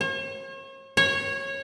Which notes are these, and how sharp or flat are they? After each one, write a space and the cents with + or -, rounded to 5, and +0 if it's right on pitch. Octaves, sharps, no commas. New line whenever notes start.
C#5 -45
C#5 -20